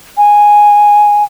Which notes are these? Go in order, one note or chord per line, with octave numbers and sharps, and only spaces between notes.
G#5